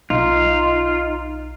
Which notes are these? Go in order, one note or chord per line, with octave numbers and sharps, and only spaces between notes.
B1 D#4 F4